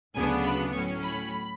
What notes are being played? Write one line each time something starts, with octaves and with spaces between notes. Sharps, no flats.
D2 C#3 F#3 B3 D4 G#5
B5
A2 F#3 C#4 C#6
B5